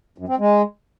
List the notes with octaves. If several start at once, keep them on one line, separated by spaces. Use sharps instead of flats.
F#2
C4
G#3